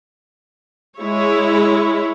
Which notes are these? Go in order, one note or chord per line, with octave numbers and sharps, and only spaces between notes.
G#3 E4 C#5